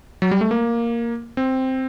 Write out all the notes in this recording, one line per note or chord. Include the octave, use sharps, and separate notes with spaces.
F#3
G3
A3
A#3
C4